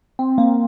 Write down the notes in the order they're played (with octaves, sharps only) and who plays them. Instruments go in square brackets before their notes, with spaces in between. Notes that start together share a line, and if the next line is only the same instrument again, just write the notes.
[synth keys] C4
A#3